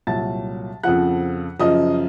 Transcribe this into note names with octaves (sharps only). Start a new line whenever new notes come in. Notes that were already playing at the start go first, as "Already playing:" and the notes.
C2 A#2 F#3 A5 A6
F2 C#3 F3 F#5 F#6
F#2 C#3 F3 D#5 D#6